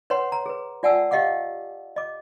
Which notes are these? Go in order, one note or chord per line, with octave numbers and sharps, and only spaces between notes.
B4 C#5 F#5 C6
A#5
G#4 B4
F4 D5 F#5 G#5 A5 E6
G4 D#5 F5 F#5 D6
D#5 D6